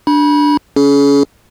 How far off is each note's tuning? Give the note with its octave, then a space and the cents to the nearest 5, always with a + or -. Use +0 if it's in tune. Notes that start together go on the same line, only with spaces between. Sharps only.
D4 +0 B5 -30
C#4 +25 G#4 +40